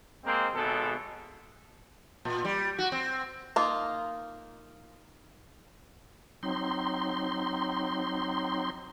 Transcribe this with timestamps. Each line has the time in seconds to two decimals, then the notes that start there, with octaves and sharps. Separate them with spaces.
0.25 G#3 A#3 C4
0.55 G#1 B2 G#3 A4
2.25 A#2
2.45 G3
2.78 F#4
2.92 C4
3.56 A#3 D#4 F4
6.43 F#3 C4 D#4 C6